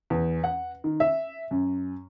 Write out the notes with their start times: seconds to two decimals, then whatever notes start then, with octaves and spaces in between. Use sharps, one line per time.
0.10 E2
0.44 F#5
0.84 D#3
1.00 E5
1.51 F#2